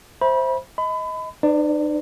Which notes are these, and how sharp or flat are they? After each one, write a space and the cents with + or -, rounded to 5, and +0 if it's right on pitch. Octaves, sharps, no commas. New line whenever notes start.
C5 +5 E5 +0 B5 -30
D#5 +25 B5 +30
D#4 -45 B4 +35 D5 +0